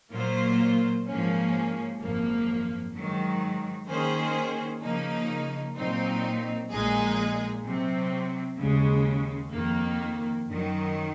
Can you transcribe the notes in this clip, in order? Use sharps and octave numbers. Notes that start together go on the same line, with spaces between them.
A#2 F#3 A#3 F4 C5
G#2 F3 A#3 C#4
G#1 F#2 F3 A#3
G#2 D#3 F#3
D#3 A#3 C#4 G#4 C5
C#3 F3 A#3 D#4
A#2 F#3 C4 D#4
A#1 A#2 G#3 D#4 G#4
C3 F#3 C4
D#2 C#3 G#3
F2 D#3 A#3
F#2 D#3 F#3